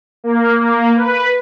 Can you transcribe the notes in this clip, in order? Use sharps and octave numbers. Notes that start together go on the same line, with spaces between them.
A#3
A#3
B4